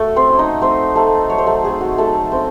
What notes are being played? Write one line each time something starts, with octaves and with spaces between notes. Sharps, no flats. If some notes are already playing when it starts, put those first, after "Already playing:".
Already playing: A3 F#4 A4
C4 C5
C#4 E4
D#4 D#5
A3 C4 C5
A3 C4 D#4 A4
F#3 C#5
C5
A3 A4
A3 C4 G#4
F#4
F#3 A3 A4
C4 C#4 E4 C5